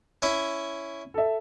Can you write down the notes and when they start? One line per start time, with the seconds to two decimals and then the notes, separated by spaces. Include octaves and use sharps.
0.22 C#4 E4 E5
1.14 A4 E5